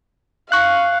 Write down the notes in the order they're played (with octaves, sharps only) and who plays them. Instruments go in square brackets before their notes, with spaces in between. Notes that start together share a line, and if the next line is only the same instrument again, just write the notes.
[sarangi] F5 [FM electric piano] C#6 F#6